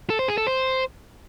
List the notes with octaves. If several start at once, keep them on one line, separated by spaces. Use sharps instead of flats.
A4
C5
G#4
A4
C5